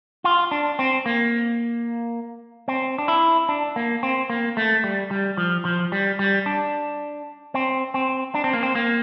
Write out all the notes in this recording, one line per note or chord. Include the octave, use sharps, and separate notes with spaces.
F4
D4
C4
A#3
C4
D4
E4
D4
A#3
C4
A#3
A3
G3
G3
F3
F3
G3
G3
D4
C4
C4
D4
C4
A#3
C4
A#3